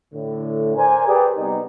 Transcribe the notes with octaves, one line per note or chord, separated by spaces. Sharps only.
A2 D3
A#4 C5 D5 G#5
G4 G#4 A#4 B4 D5
C3 G3 B3 D#4